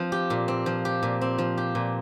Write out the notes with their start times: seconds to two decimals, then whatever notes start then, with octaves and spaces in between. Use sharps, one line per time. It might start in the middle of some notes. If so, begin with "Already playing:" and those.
Already playing: F3 C4
0.12 G4
0.30 A#2
0.48 C4
0.66 F3
0.85 G4
1.03 A#2
1.21 C4
1.38 F3
1.58 G4
1.75 A#2